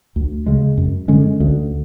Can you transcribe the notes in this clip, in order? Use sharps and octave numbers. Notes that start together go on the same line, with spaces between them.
D2
C#3 G#3
F#2
D3 G#3 C#4
D2